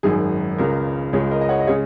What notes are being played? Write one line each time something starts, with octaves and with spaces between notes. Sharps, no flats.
G#1 F#2 D#3 G#4
C#2 C#3 G#3 A#4
C#2 C#3 G#3 G#4 C#5
A#4 D#5
D#5
C#5 F#5
D#5
C#3 G#3 G#4 C#5